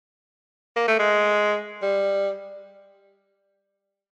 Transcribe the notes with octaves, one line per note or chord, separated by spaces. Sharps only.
A#3
A3
G#3
G3